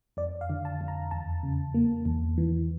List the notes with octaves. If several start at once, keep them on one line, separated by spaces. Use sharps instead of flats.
F2 D5
F5
D3
A5
F2
A#5
E2 A5
C#3
A#3
E2
E3